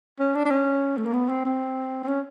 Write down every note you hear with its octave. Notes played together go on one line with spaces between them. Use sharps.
C#4
D4
D4
C#4
A3
A#3
B3
C4
C4
C4
C#4